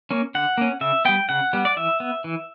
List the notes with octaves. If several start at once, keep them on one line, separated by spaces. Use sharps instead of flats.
A#3 C#4
D3 F#5
A#3 C#4
C#3 E5
G3 B3 G5
C#3 F#5
G3 B3
D5
E3 E5
B3
E3